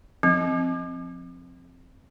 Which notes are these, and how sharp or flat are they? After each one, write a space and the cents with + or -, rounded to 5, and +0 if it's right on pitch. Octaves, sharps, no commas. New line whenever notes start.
F3 +0 C4 +0